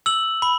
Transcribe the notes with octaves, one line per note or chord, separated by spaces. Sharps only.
E6 F#7
B5